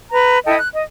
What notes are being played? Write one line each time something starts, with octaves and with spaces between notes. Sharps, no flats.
B4 A#5
E4 A4 D#5 G5
F#6
D#5